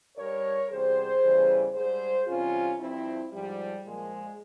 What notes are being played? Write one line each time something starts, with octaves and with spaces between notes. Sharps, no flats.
G2 G3 A#4 C#5
E2 C3 G3 G#4 C5
E2 C#3 E3 G3
G#2 G3 G#4 C5
E2 C3 G3 C#4 F4
G2 F3 C4 E4
G#2 F3 G3
A#2 F3 G#3